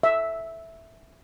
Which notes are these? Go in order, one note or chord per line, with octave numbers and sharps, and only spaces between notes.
E5